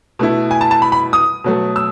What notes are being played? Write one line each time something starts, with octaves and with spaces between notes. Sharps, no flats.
B2 A3 E4
G#5
A5
A5
B5
B5
D#6
B2 F#3 A3
E6